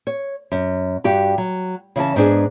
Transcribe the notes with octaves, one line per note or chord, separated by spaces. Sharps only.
C#5
F#2
G2 F#4 G4
F#3
C#3 E3 C#4 A5
G#2 B3 D4 G#4